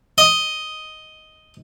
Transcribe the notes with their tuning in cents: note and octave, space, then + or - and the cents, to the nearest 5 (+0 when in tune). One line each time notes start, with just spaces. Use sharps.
D#5 +5